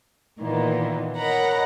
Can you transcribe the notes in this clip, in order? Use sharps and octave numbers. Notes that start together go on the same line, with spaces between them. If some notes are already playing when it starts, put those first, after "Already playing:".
A#2 D#3 E3 A#3 B3
A#4 C#5 D#5 F#5 A#5 B5